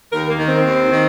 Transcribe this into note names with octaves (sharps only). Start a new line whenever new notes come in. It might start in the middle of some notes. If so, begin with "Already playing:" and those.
D#2 A#4
A#3
D#3
C4
D#2
D#3